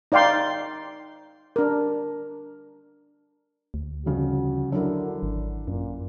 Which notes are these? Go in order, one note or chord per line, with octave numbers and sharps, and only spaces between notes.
D#4 D5 F5 G5 C6
D4 A#4
D2
G1 F2 C#3 F#4
D3 F#3 D4 E4 A#4
G#1
F#2 A#2